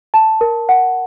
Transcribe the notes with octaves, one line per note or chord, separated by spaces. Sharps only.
A5
A#4
F#5